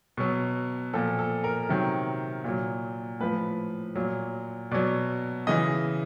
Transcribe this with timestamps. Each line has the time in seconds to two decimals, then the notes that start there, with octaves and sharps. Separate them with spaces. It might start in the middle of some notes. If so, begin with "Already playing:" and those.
0.17 B2 F#3
0.93 A#2 F3 A4
1.19 A4
1.44 A#4
1.69 C3 D#3 F#3
2.44 A#2 F#3
3.20 A2 F3 B4
3.95 A#2 F#3
4.71 B2 F#3 D5
5.47 C#3 E3 D#5